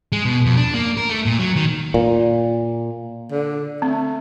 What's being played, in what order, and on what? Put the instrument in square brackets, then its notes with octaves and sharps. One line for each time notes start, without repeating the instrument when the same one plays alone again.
[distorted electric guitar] G#3
B2
F2
D4
A#3
A#4
A3
A#2
F#3
D#3
[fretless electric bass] A#2
[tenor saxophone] D3
[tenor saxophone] A3 [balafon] C4